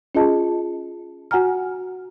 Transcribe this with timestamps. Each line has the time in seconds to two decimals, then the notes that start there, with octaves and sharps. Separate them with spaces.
0.15 C#4 F4 G#4 D#5 A5
1.31 F#4 F#5 G#5 A#5 F6